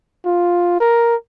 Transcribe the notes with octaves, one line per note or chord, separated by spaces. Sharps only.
F4
A#4